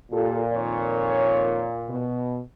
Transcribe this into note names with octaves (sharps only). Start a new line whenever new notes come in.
A#2 F4 G4 A4
F2 D#3 C#5
B2